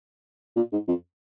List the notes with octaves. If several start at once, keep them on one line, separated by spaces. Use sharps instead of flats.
A#2
G#2
F2